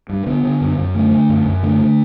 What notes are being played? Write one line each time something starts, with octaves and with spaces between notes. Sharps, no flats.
G2
D3 B3
D3
F#2
F#2
D3 A3
D3
F#2
F#2
D3 A3
D3